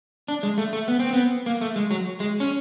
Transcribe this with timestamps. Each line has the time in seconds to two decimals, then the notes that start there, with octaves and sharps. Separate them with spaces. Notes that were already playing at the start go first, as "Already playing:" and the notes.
0.28 D4
0.43 G#3
0.58 A3
0.73 A3
0.88 B3
0.99 C4
1.13 B3
1.46 A#3
1.61 A3
1.76 G#3
1.91 F#3
2.20 G#3
2.40 C#4